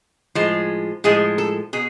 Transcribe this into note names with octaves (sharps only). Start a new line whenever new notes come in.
A2 F3 G#3
A2 F3 G#3 G#4
A4
B2 G#4